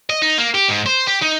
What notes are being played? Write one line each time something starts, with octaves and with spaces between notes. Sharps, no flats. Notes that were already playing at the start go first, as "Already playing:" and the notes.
D#5
D#4
A#3
G4
G#2
C5
G4
D#4